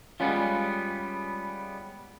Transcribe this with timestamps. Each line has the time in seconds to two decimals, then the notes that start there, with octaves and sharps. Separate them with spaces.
0.20 G3 G#3 B3 C#4 F4